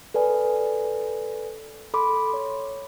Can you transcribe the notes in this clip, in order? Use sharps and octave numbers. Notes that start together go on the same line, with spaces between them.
A4 B4 D5 G#5
A4 B5 C6 D6
C#5